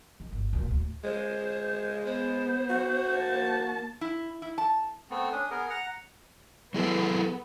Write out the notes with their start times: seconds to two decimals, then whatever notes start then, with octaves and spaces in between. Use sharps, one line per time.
0.20 D#3
0.33 G1
0.53 D2 A#2
0.71 D2 A2
1.04 G#3 C5
2.05 B3 C5
2.70 F#4
3.17 A#3 A5
4.01 E4
4.42 E4
4.58 A5
5.10 A3 B3 C4
5.32 C#4 D4 D#6
5.50 B3 G#4 A#4
5.70 F#5 A#5
6.74 F#3 B3 E4 G#4 A4